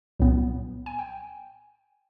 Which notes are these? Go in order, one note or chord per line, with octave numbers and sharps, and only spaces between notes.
C2 A#2 F#3 B3
G#5
G5